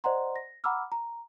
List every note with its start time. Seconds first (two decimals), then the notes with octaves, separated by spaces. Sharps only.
0.04 C5 D5 D#5 F#5 A#5 C6
0.36 A#6
0.64 F#5 A#5 B5 D6 E6 F6
0.92 A#5